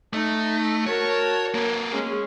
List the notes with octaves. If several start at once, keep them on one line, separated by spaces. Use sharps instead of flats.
A3 D#4
F#4 A#4 C#5 A5
A#3 B4
G#3 C#4 G#4